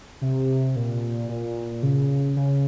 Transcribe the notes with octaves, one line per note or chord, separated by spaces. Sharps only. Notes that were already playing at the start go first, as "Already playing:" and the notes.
C3
A#2
A#2
C#3
C#3